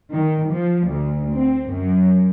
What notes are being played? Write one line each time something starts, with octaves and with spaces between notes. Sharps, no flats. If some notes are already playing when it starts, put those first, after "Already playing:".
D#3
F3
D2
C4
F#2